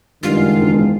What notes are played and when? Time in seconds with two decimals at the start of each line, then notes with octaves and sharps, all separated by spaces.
0.23 F#1 G2 D#3 G#3 F4
0.60 E1